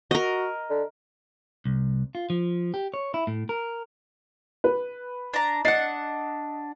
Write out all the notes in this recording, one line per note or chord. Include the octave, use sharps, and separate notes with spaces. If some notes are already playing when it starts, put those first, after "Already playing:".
F#4 A#4 D#5
D3
C2
F4
F3
G4
C#5
E4
A2
A#4
B4
D4 A#5
D4 D#5 F#5 C7